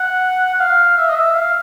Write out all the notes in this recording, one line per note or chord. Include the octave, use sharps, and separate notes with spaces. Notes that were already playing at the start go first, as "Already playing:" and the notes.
Already playing: F#5
F#5
F5
E5
D#5
E5
F5